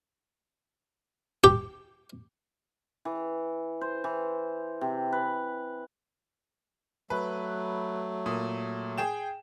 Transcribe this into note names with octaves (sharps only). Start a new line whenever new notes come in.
G4
E3
C5
E3
C3
B4
F#3 A3 B4
A#2 D#6
G#4 G5 E7